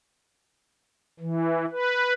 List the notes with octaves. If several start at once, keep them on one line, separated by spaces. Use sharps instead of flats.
E3
B4